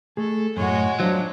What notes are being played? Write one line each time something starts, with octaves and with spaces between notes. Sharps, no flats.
A3 G#4 A4
F#2 A2 G#3 F#4 C#5
F#3 D4 F4 C5